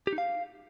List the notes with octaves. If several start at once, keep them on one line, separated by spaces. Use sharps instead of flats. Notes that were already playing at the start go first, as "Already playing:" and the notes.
G4
D#4
F5